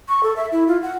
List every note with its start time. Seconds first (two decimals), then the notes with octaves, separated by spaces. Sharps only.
0.09 C#6
0.23 A4
0.36 E5
0.52 E4
0.68 F4
0.83 F#5